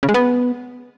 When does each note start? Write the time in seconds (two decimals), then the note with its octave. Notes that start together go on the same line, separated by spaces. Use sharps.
0.03 C#3
0.09 G#3
0.14 B3